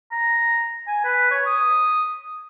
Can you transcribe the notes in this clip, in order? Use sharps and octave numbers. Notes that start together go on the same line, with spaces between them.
A#5
G#5
B4
C#5
D#6